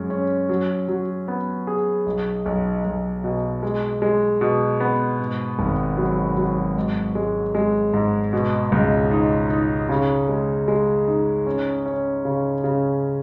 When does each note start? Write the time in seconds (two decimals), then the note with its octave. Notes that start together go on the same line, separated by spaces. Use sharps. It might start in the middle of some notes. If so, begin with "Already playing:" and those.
Already playing: F#2 G#3 C#4
0.10 C#4
0.49 F#3
0.89 F#3
1.28 B3
1.67 G#4
2.06 B1
2.46 B1
2.84 B1
3.24 B2
3.63 G#3
4.02 G#3
4.41 B2
4.80 B3
5.19 G#2
5.59 G#1
5.97 F#3
6.37 F#3
6.76 G#2
7.15 G#3
7.55 G#3
7.94 G#2
8.33 B2
8.72 C#2
9.11 D#4
9.50 D#4
9.89 C#3
10.29 G#3
10.68 G#3
11.08 D#4
11.47 C#4
11.86 C#4
12.25 C#3
12.64 C#3